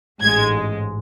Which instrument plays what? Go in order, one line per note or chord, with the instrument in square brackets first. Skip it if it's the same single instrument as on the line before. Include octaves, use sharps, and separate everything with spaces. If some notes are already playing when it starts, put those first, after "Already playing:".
[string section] A1 G#2 G#3 G#6